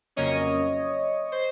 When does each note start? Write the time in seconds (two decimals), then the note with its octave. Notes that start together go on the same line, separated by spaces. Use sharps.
0.16 F2 C#3 F#3 A#3 C#4 C#5 D#5
1.32 C5